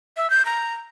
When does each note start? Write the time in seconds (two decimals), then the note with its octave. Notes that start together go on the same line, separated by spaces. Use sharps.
0.17 E5
0.30 G6
0.45 A#5